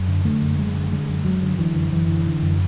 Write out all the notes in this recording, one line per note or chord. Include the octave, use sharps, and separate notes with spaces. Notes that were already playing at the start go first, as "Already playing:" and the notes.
Already playing: F#2
D3
D3 A3
F#2
F#2 G#3
D3
D3 G#3
F#2
F#2 F#3
D3
D3 E3
F#2
F#2 E3
D3
D3
F#2